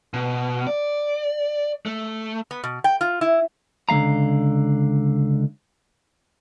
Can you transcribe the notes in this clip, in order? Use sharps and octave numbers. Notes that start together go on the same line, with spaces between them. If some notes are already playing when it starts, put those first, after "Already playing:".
B2
D5
A3
B3
B2
G5
F4
E4
C#2 D3 G#3 F5 A#5